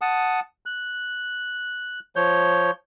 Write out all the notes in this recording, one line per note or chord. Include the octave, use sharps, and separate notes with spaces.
F#5 A5 D#6
F#6
F3 C#5 G6